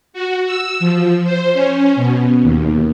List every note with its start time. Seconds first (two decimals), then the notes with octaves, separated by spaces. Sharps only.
0.13 F#4
0.46 E6
0.80 F3
1.25 C5
1.53 C#4
1.96 B2
2.43 D#2